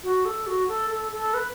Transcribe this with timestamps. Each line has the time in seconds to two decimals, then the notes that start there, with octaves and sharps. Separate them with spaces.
0.04 F#4
0.25 A4
0.47 F#4
0.68 A4
0.91 A4
1.12 A4
1.34 B4